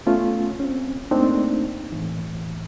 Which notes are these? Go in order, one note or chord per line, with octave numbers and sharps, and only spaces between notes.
A3 B3 C#4 F4
C4 C#4
A3 A#3 C4 D4 D#4
A2 E3